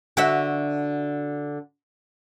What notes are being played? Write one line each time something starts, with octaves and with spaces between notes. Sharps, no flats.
D3 F#4 E5